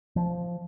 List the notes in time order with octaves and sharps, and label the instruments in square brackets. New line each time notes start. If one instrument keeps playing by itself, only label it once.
[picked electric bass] F3